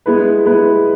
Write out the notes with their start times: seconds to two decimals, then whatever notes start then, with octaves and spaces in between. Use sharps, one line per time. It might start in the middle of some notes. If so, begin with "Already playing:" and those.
0.06 G#3 B3 E4 B4
0.45 G#3 B3 E4 B4